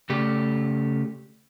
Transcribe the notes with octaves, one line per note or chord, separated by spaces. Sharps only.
C#3 A3 G4 D5